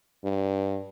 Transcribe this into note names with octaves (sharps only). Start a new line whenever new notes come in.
G2